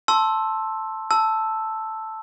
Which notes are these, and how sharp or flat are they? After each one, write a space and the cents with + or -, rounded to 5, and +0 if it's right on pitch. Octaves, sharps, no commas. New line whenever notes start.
A5 +0 C6 +20 E6 +0
A5 +0 E6 +0